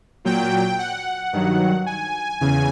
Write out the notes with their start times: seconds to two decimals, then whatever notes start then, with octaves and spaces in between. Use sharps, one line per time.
0.25 A#2 F#3 G5
0.79 F#5
1.33 G2 D#3 F#3
1.86 G#5
2.40 E2 C#3 G#5